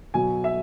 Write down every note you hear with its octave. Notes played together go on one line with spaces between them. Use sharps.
B2 F#3 G#5
E5